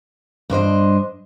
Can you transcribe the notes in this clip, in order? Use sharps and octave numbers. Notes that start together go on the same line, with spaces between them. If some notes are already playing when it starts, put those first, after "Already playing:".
G2 D4 C5 D#5